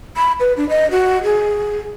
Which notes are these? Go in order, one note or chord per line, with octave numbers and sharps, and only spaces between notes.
B5
B4
D4
D#5
F#4
G#4